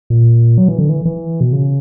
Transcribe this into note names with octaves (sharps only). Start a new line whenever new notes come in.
A#2
F#3
E3
D3
E3
E3
B2
C#3